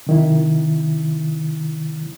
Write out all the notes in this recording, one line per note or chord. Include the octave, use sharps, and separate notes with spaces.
C3 D#3 E4